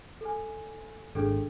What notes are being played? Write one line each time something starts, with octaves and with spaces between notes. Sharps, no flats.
A4 G#5
G#1 D4 G#4 A4